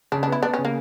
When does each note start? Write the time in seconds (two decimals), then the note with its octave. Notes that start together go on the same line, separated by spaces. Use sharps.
0.12 C#3 D4
0.23 D4
0.27 B3 E4
0.43 B3 D4
0.54 C#3 C#4
0.65 A#3